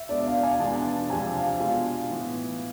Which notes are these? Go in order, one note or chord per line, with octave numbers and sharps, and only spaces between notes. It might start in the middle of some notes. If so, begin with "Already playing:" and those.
Already playing: E5
B2 G#3 B3 D4 D5
F5
F5
G#5
E2 B2 G#3 D4 A5
F2 C3 G#3 D4 F4 G#5
F5
B2 G#3 D4 F4
A2 E3 B3 F4